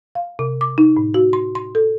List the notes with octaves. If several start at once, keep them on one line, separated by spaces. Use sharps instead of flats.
F5
C3
D6
D#4
A2
F#4
C6
C6
A4